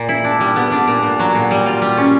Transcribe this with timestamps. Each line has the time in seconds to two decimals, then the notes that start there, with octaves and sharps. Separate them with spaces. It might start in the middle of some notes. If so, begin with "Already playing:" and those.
Already playing: A#2
0.09 E4
0.24 D4
0.40 G3
0.56 B3
0.72 D4
0.88 A#2
1.03 A#2
1.19 F#3
1.35 A#2
1.51 G3
1.66 F4
1.82 G3
1.97 C#4